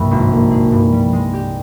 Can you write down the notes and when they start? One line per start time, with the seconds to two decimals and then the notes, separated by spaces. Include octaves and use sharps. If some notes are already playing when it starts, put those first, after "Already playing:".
Already playing: C2 G2 A#2
0.11 G#1
0.32 A#3
0.51 G#4
0.72 G2
0.92 G3
1.13 G#3
1.33 G4